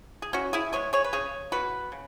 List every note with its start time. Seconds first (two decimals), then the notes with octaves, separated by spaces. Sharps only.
0.22 G#4
0.33 E3 C#4 F#4
0.53 E4 G#4
0.72 G#3 B3 G#4 C#5
0.93 G#4 C#5
1.04 B4
1.13 C#3 G#4 C#5
1.52 E3 B3 F#4 B4
1.92 C#3